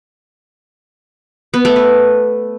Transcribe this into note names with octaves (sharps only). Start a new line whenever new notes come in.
B3
A3
B4